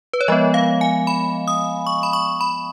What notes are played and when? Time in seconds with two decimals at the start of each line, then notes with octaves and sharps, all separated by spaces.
0.13 B4
0.21 C#5
0.28 F3 G#3 B3 D#5
0.54 F5
0.81 G#5
1.07 B5
1.48 D#6
1.87 C#6
2.03 B5
2.13 C#6
2.41 B5